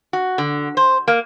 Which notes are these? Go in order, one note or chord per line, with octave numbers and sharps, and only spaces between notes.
F#4
D3
C5
A#3